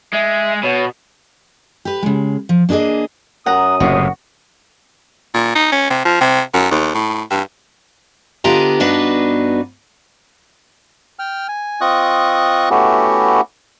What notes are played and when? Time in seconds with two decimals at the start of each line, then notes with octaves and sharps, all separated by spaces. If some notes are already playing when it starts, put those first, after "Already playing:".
0.13 G#3 E5
0.63 B2 C#5
1.85 G4 B4
2.03 C#3 G#3
2.49 F3
2.69 A#3 D4 G4 G#4 D#5
3.46 F#2 F#5 A#5 D#6
3.80 F#1 A2 C3 F#4
5.34 A#2
5.55 D#4
5.72 C#4
5.90 C3
6.05 F3
6.20 C3
6.54 F#2
6.71 D#2
6.94 A2
7.31 G2
8.44 D3 B3 F4 G4 D#5 A#5
8.80 G2 B3 D4 D#4 F#4 B4
11.19 G5 F6
11.49 G#5
11.81 C4 F4 D#5 C#6 D#6 F#6
12.71 A3 B3 C#4 E4 F#4 G4